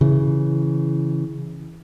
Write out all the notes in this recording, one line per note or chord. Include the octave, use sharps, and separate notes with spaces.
C#3 E3